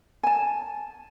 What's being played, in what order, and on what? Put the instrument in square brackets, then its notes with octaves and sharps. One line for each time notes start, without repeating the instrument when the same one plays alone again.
[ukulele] G#5 A5